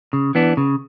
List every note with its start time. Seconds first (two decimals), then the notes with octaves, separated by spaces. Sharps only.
0.13 C#3
0.35 E3 B3 D4
0.57 C#3